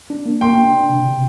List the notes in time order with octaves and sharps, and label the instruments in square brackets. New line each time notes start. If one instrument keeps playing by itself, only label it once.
[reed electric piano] D4
A#3
[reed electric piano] A#3 [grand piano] G5 C6
[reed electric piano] D4
D4
C3
C3